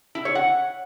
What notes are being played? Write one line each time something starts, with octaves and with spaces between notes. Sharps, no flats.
E4
C#5
F#5